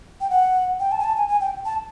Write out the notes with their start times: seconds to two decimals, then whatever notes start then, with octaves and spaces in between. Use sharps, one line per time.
0.21 G5
0.30 F#5
0.80 G5
0.92 A5
1.00 G#5
1.04 A5
1.17 G#5
1.28 G#5
1.40 G5
1.65 A5